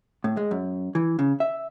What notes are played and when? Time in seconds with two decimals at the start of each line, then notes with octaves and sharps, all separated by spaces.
0.24 A2
0.37 G#3
0.51 F#2
0.95 E3
1.19 C#3
1.40 E5